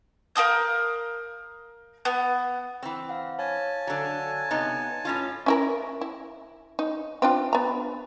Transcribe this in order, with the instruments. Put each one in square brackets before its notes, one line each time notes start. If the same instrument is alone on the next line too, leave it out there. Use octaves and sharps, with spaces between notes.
[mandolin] A#4 F5 D#6 G6
B3
[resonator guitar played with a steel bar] E3 C4
[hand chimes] F5 F#5
[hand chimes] C#5 F5 [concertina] G#5 A5
[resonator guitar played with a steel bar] D3 F#3
C3 B3 D#4
A2 C#4 F4
[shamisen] C#4 E4 A#4
E4
D#4
C4 D4 F4
B3 A#5